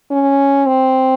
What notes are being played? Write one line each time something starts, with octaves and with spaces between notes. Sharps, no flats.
C#4
C4